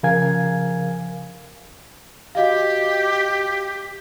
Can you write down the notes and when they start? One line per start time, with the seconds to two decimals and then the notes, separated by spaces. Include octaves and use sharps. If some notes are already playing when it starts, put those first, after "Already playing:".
0.03 C#3 F3 A#4 F5 G#5 G#6
2.35 F#4 G4 D#5 F5